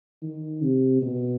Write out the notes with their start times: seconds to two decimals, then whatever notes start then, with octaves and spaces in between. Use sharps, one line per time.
0.23 D#3
0.62 C3
1.02 B2